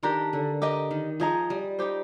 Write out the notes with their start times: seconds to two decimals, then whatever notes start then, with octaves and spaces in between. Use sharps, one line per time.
0.03 D#3 D4 G4 A#4
0.33 D3
0.62 G4 A#4 D#5
0.91 D#3
1.20 F3 G#4 D#5 A#5
1.50 G3
1.79 D#4 G4 C5